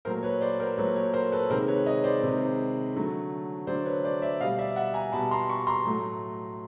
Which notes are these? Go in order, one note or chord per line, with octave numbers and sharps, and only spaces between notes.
A#2 F#3 A3 A#4 C5
B4 C#5
C5 D5
A#4 C5
A#2 F#3 A3 B4 C#5
B4 C#5
A#4 C5
A4 B4
C3 D#3 G#3 A#4 C5
B4 C#5
C#5 D#5
C5 D5
C3 D#3 G#3
D3 F#3 A3
D3 F#3 A3 C5 D5
B4 C#5
C5 D5
D5 E5
B2 G3 D#5 F5
D5 E5
E5 F#5
G#5 A#5
B2 G3 A5 B5
A#5 C6
B5 C#6
A#5 C6
A2 F#3 A3